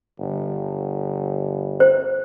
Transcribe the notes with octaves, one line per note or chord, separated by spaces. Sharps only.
G1
C5